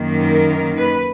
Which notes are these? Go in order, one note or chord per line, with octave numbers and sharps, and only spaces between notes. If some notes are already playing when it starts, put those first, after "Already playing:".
Already playing: F#2 D#3 A#3
A#4
B4